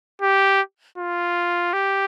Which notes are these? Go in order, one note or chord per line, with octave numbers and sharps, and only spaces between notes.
G4
F4
G4